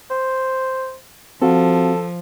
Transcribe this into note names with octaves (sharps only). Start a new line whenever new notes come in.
C5
F3 C4 F#4 A4 F5